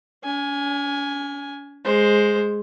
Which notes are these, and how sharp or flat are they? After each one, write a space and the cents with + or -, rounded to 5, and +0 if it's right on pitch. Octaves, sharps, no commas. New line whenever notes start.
C#4 +45 G#5 +0
G#3 +0 C5 +5